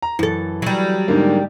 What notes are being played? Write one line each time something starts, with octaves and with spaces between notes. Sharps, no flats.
A#5
F#2 E3 A4
F#3 G3
G#2 D3 A#3